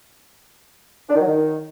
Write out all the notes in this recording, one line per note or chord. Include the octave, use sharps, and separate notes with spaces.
D4
D#3
F#3
D#3